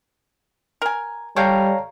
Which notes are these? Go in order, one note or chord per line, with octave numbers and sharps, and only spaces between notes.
A#4 G#5
G3 A4 C#5 F5 G5 A#5